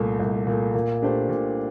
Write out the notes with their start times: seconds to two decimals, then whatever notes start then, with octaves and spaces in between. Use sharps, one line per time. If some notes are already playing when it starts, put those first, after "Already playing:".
Already playing: C2 A#2 A3
0.20 C2
0.47 A#2 A3
0.74 A#2
1.02 A3 D4 G4 C5
1.29 A#2